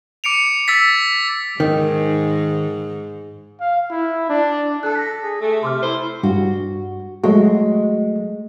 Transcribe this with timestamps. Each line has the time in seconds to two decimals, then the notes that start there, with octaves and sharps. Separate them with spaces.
0.24 D6 C#7 D7 F7
0.68 E6 A6 B6
1.60 G#2 D#3
3.60 F5
3.90 E4
4.29 D4
4.83 A4 A5 F#6
4.95 A#6 B6
5.23 G#4
5.41 A3 A4
5.63 C3 C6 D6 F6
5.82 E4 C5
6.23 G2 F#4
7.24 F#3 G#3 A3 F#4